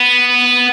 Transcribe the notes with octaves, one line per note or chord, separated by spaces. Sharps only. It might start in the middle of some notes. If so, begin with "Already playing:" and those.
Already playing: B3